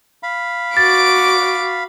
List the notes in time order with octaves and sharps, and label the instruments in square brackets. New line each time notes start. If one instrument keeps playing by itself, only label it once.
[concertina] F5 B5
[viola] F#4 [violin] D6 D7 [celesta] A6